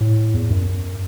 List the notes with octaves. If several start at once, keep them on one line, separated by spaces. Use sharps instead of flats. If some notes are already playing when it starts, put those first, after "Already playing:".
A2
E2
F#2